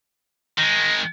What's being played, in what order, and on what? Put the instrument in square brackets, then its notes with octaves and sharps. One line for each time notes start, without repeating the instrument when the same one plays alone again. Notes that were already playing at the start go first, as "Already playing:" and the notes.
[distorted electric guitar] D#3 G#3 [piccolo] A#6